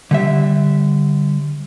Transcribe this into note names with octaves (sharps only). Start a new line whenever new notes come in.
D3 G3 E5